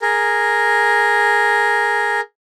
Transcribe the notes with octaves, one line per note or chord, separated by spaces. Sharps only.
G#4 A#4